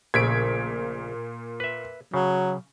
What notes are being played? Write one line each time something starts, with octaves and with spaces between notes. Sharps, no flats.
A#1 A#2 C#3 A3 G#6 B6 D7
B4 E5
C#3 F#3